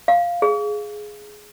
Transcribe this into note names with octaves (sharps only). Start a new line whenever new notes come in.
F5
G#4